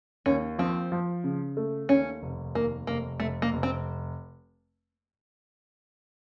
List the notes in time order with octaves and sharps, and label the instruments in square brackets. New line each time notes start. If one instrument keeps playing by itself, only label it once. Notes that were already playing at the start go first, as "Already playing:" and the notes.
[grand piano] D#2 [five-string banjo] C#4
[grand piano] F3 [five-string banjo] C4
[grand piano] F3
C#3
A3
[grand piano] D#2 [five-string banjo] C#4
[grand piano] F1
[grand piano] D#2 [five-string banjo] A#3
[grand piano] F1 [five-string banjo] A#3
[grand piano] F1 [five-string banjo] A3
[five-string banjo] A#3
[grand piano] F1
[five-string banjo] C4